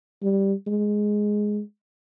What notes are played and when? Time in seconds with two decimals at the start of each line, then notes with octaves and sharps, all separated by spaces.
0.23 G3
0.67 G#3